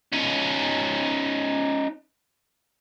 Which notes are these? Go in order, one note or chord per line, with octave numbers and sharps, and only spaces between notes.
C#4 D#4